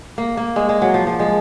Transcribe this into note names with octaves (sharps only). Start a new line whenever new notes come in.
A#3
A#3
G#3
G#3
F#3
F3
F3
G#3